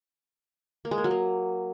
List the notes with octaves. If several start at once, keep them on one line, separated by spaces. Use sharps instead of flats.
A#3
G#3
A#3
F#3
A#3